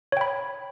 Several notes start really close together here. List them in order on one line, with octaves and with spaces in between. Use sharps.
C#5 G5 B5